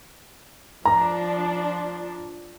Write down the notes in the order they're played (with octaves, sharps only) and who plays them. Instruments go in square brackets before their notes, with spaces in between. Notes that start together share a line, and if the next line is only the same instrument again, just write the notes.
[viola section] F3 D4 [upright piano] A#5